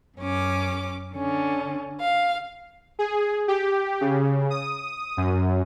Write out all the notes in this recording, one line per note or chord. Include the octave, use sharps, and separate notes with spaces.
F#2 C#4 D6
D3 C#4
F5
G#4
G4
C#3
D#6
F#2